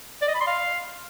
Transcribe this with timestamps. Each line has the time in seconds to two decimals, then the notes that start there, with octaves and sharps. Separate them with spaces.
0.22 D5
0.28 D#5
0.34 B5
0.41 C6
0.47 F5